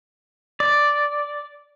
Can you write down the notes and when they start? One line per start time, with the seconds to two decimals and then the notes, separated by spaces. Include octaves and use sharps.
0.60 D5